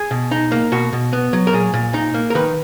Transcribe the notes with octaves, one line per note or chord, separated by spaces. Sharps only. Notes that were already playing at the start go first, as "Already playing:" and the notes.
Already playing: G#4
B2
D#4
A#3
B2 F#4
B2
B3
F#3
A#4
A#2 G#4
A#2
D#4
A#3
A#4
D#3 B4